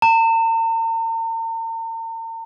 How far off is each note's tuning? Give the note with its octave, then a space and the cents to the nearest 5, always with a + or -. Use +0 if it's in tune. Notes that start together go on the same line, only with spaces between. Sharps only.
A#5 -45